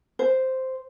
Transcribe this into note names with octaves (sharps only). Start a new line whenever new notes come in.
C5